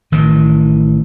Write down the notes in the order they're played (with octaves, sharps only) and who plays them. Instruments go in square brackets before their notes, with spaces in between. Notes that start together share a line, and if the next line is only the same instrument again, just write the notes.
[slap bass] A1 D#3 E3